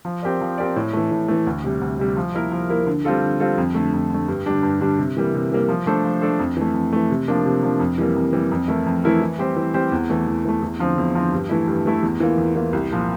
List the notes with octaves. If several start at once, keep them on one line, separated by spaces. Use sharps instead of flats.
F3
C4 G4 A#4 D5
F3
C4 G4 A#4 D5
A2
E3 A3
A2
E3 A3
D2
C3 G3
D2
C3 G3
F3
A#3 E4 A#4
F3
A#3 E4 A#4
D3
G3 C4 F4 A4
D3
G3 C4 F4 A4
F2
D3 A3
F2
D3 A3
G2
D3 G3 D4
G2
D3 G3 D4
C3
E3 G3 A#3
C3
E3 G3 A#3
F3
A3 D4 A4 C5
F3
A3 D4 A4 C5
F2
E3 A3
F2
E3 A3
C3
F3 A#3 D4
C3
F3 A#3 D4
F2
E3 G3 A#3
F2
E3 G3 A#3
F2
E3 A3 E4 A#4
F2
E3 A3 E4 A#4
E3
G3 C4 G4 C5
E3
G3 C4 G4 C5
E2
E3 A3
E2
E3 A3
E2
D3 F3 C4
E2
D3 F3 C4
G2
E3 A3 E4
G2
E3 A3 E4
E2
E3 A#3 F4
E2
E3 A#3 F4
C2
A#2 F3 C4